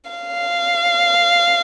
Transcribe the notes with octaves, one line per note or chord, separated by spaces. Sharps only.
F5